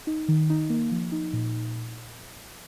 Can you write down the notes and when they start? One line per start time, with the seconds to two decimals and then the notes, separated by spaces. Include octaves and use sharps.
0.07 D#4
0.28 D#3
0.50 D#4
0.70 A#3
0.92 F3
1.12 D#4
1.33 A#2